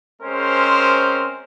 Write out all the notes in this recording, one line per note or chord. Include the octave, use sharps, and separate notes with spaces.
G#3 C4 C#4 A#4 C5